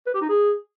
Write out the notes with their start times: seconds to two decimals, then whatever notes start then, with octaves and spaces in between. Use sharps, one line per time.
0.06 B4
0.14 G4
0.21 D#4
0.29 G#4